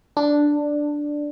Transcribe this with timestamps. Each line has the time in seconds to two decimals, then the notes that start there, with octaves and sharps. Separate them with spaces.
0.17 D4